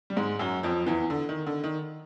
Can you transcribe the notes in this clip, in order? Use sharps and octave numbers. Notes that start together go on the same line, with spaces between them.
G3
G#2 G#3
F#2 F#3
F2 F3
E2 E3
D3
D#3
D3
D#3